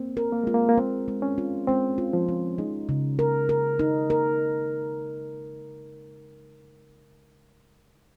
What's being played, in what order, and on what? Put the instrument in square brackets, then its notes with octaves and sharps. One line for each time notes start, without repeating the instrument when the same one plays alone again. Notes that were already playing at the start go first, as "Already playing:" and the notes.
Already playing: [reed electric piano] A#3 C4
[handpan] A#4
[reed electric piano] A#3
[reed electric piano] G#3 [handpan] F4
[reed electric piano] A#3
A#3
[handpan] G#3 [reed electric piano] C4
[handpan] G#3
[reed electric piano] C#4
[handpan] F4
[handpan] G#3 [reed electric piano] C4
[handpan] F4
[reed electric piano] F3
[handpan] C#4
[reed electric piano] G#3 [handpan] D#4
[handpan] C#3
A#4
A#4
D#4
A#4